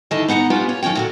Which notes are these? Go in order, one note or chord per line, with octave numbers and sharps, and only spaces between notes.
D3 D#3 E4 D#5 A5
B3 D#4 F#5 G5 A#5
A#3 B3 C#4 D4 F4 G4
C#5
D#3 F3 C#4 C#5 G5
A#2 D3 F#4